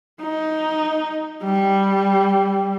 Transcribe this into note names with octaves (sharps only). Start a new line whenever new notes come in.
D#4
G3